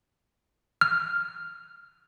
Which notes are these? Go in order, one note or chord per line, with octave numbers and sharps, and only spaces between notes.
F6